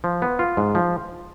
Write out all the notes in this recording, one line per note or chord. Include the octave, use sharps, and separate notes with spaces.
F3
B3
F4
G#2
F3